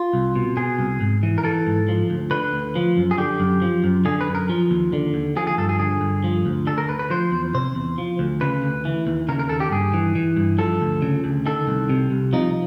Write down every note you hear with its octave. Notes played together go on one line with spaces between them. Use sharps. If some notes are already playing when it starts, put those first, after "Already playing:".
Already playing: F4
C2
B2
B2 G#4
C2
G#2
E3
A#4
E3 A4
G#2
F3
D2
D3 B4
D2
F3
F#2
G#4
D3 G4
F#2
F3
F#2
D3 G#4
B4
F#2
A#4
F3
D#2
D3
D#2
F3 G#4
G#4
G2 A4
G#4
D3 G#4
G2
F3
D2
D3 A4
A#4
D2 B4
B4
F3 C5
E2
C3 C5
E2
F3
D2
C#3 B4
D2
E3
D#2
C#3 A#4
A#4
D#2 A4
G4
G2 G#4
E3
E3
G2
F3 A4
D2
C#3
D2
D#3 A4
C2
C3
C2
F3 D#4